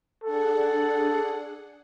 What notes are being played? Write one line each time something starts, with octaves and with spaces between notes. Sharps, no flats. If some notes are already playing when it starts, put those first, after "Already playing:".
D4 G#4 A4 F#5